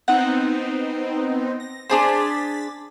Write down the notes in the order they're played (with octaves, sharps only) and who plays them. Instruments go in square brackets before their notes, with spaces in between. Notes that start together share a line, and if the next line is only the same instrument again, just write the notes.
[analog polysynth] B3 C4 D#4 [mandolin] F#5
[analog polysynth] A#6
[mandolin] D4 G#4 C5 [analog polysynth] A6 B6